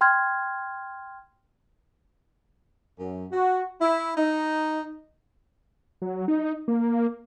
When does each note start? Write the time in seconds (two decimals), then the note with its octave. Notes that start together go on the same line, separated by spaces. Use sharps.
0.01 G5 C6 F6 G#6
2.98 F#2
3.31 F#4
3.80 E4
4.17 D#4
6.02 F#3
6.28 D#4
6.68 A#3